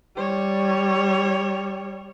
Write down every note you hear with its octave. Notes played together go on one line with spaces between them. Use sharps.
G3 C#5